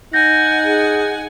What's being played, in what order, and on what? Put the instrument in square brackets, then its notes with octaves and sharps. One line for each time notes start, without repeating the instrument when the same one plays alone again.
[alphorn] D#4 [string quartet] F#5 G#5 [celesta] G6 A#6
[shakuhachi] G#4